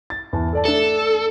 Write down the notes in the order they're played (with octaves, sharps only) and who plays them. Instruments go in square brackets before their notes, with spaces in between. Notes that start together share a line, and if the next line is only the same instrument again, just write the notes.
[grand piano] A6
E2 A5
A4 D5 A5
[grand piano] A3 D4 [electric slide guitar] A4